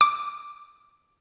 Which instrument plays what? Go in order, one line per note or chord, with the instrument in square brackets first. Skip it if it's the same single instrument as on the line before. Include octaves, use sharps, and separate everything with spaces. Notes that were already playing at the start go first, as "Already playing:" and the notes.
[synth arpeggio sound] D6